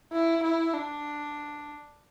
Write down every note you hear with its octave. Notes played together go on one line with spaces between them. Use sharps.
E4
E4
D4